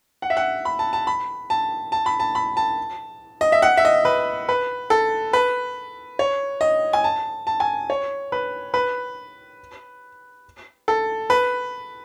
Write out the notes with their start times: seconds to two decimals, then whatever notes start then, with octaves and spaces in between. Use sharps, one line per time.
0.22 F#5
0.30 E5
0.37 F#5
0.65 B5
0.79 A5
0.93 A5
1.07 B5
1.50 A5
1.92 A5
2.06 B5
2.20 A5
2.35 B5
2.57 A5
3.41 D#5
3.52 E5
3.62 F#5
3.77 E5
3.85 D#5
4.05 B4
4.49 B4
4.90 A4
5.33 B4
6.19 C#5
6.61 D#5
6.93 G#5
7.04 A5
7.47 A5
7.60 G#5
7.90 C#5
8.32 B4
8.74 B4
10.88 A4
11.30 B4